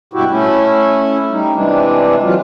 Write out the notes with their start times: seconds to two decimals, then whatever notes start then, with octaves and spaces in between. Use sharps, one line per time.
0.13 G2 B2 E4 F#4 G4
0.31 A3 C#4 E4
1.31 G3 D#4
1.53 C3 E3 G#3 D4
2.23 E3 F#3 F4